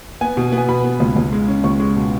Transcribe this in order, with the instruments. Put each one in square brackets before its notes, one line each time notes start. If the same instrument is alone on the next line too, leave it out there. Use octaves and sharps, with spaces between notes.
[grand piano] B3 G#5
B2
B3
G#5
B2 B5
B3
C#2
C#2
G#3
C#4
C#2 C#6
G#3
B2